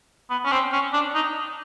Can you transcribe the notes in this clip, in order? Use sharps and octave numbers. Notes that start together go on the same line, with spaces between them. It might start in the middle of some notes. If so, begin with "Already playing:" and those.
B3
C#4
C4
C#4
D4
D#4